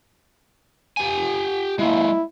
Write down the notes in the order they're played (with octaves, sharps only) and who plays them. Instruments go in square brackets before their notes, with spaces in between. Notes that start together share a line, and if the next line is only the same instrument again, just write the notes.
[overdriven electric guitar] G4 G#5
[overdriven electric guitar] G#3 A#3 [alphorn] E4